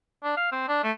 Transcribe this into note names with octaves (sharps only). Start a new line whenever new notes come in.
D4
F5
C4
D4
A3